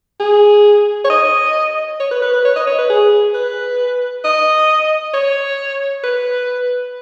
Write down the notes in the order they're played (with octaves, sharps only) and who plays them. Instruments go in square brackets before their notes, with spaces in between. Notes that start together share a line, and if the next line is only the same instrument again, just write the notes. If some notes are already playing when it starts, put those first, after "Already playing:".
[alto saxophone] G#4
C#5
D#5
C#5
B4
B4
B4
C#5
D#5
C#5
B4
G#4
B4
D#5
C#5
B4